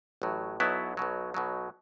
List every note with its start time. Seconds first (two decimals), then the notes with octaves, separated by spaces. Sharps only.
0.22 A1 A2 F#3
0.60 B1 B2 F#3 B3 E4
0.97 B1 B2 F#3
1.34 B1 B2 F#3